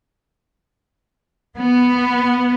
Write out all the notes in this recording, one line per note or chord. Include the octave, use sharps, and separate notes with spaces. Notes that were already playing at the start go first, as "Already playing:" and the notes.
B3